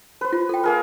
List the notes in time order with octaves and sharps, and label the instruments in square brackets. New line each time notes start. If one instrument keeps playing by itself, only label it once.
[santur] B4 C5
[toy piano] F4
A4 G5
[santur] A#3 G#4 A#4